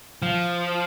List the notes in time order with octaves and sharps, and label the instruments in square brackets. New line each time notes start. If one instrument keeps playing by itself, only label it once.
[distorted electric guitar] F3